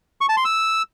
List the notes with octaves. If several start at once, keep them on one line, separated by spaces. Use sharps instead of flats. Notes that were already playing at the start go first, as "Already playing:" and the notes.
C#6
A5
C6
E6